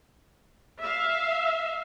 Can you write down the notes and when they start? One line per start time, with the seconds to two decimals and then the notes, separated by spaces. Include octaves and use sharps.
0.81 E5 F5